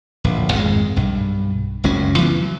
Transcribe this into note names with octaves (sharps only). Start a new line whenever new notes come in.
D1 A#1
G#1 F2 E3 G#3
B1 G2
F#1 C#2 F#3 C#4
D2 E3 B3
F#3